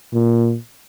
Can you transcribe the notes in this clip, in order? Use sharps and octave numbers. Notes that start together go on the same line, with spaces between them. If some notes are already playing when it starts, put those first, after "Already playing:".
A#2